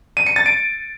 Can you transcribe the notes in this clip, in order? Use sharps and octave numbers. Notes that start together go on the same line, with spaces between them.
D#7
C#7
A6
D7